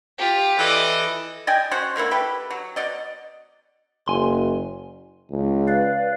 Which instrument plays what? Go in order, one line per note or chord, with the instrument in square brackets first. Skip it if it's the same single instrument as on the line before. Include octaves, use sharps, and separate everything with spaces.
[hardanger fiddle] F4 G4
[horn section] E3 A4 D#5 [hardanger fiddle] D5
[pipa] D5 D#5 G5 G#5
C#4 F#4 C5 F#5
D3 A#3 C#4 E4
G4 A4 B4
F#3
B2 D5 D#5
[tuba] F#1 [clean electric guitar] G#5 C6
[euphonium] C#2
[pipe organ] B4 D5 F5